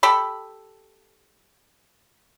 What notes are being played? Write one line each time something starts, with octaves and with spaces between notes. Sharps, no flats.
G4 A4 B5